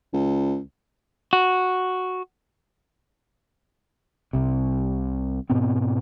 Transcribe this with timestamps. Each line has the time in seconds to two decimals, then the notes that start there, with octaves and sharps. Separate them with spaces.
0.13 C#2
1.33 F#4
4.33 C2 C3
5.50 G#2 B2 B3 C4